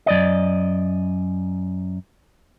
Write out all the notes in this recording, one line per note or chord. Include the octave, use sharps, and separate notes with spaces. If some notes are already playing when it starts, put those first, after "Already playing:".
F#2 D5 D#5